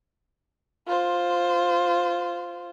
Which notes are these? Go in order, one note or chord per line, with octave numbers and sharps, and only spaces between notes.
F4 C5